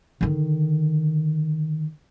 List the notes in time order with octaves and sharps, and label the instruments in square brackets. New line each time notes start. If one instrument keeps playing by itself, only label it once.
[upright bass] D3 D#3